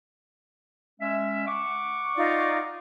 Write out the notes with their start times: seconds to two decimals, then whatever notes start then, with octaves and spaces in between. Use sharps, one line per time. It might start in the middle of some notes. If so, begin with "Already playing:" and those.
1.01 G#3 C#4 E5
1.47 F#5 C#6 D6
2.17 D#4 F4 D5